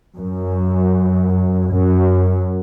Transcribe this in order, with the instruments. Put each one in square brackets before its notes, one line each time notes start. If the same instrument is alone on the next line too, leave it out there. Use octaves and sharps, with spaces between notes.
[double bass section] F#2
F#2